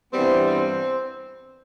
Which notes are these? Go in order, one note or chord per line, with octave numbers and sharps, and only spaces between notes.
G2 E3 G3 B3 C4
C4